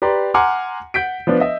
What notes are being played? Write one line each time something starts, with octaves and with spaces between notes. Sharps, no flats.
G4 B4 D5 A#5 C6
F#5 G#5 A#5 C6 D6 F6
F#5 G6 B6 D7
F3 B3 D4 B4
D#5 E5